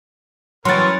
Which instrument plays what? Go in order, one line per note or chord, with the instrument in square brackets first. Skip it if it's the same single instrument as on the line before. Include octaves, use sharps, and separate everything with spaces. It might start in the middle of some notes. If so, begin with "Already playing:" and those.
[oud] E3 F#3 [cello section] C#4 C#5 [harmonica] A#4 B4 [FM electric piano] C6 A6